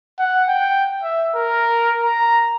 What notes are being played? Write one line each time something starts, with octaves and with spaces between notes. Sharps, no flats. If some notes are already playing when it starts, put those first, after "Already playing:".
F#5
G5
E5
A#4
A#5